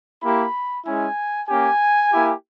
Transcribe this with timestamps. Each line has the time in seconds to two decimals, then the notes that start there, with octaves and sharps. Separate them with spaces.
0.23 A#3 E4 G4 B5
0.86 G#3 C#4 E4 G#5
1.49 A#3 C#4 G4 G#5
2.12 A#3 E4 G4